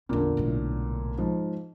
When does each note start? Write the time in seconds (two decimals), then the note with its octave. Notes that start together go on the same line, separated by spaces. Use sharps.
0.09 A1 E2 A#2 D3
0.37 B1 A2
1.18 G#2 F3